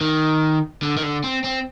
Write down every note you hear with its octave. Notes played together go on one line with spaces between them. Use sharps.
D#3
D3
D#3
D3
C4
C4